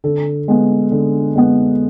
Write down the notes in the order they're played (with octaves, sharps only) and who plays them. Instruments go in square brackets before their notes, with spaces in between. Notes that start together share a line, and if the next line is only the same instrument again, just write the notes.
[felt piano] D3 A4
G#3 B3
D3
G#3 B3